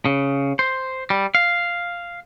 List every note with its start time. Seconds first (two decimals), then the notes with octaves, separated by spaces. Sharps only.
0.05 C#3
0.59 C5
1.10 G3
1.35 F5